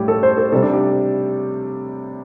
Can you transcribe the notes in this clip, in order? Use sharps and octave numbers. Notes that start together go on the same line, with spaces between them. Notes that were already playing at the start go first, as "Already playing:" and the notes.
Already playing: A2 G3 G4
A4
C5
A4
C3 G3 A4
D4
G4